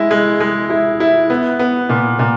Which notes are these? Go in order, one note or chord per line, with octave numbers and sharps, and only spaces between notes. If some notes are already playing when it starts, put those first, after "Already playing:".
Already playing: G#3 E4
G#3
G#3
E4
E4
B3
B3
A#2
A#2